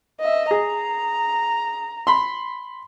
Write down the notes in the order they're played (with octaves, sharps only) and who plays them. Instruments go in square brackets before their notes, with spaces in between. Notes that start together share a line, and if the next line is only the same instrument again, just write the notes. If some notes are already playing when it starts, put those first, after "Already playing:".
[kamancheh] D#5 E5
[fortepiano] G#4 [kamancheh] A#5
[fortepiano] B5 C6